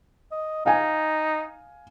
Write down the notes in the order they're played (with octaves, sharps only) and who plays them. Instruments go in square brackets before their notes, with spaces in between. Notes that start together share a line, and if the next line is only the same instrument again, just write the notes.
[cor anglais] D#5
[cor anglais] D#4 [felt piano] F5 G#5